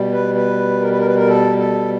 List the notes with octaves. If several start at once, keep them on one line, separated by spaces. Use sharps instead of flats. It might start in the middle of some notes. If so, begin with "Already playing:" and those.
Already playing: B2 G3
B4
B4
A#4
B4
A#4
B4
A#4
A4
A4